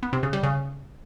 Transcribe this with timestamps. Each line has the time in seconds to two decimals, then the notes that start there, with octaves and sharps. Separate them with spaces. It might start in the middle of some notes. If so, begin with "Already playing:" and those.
0.03 B3
0.13 C3
0.23 C#3
0.33 G3
0.43 C#3